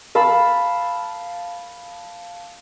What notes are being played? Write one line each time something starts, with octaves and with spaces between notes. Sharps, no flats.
F5 A5 B5 E6